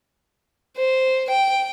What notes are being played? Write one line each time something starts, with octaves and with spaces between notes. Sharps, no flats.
C5
G5